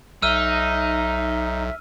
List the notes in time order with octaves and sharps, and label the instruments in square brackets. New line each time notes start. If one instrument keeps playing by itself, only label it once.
[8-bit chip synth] B1 [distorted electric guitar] D#4 [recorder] E5 [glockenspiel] E6 F6 D#7